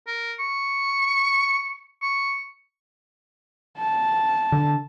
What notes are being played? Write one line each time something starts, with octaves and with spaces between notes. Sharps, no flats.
A#4
C#6
C#6
A5
D3